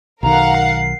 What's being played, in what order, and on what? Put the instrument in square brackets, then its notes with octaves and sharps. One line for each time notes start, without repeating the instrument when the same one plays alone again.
[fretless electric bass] B1 D#3 [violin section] A#4 F5 F#5 [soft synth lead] A#5
[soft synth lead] C7